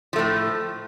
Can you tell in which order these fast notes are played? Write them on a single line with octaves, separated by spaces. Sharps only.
F3 A3 A2